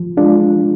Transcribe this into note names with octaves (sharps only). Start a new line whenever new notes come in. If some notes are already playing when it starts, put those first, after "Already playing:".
Already playing: F3
G#3 D4 F4